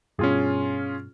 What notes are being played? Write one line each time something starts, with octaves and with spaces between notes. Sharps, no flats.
G2 B2 C#4 F4 G#4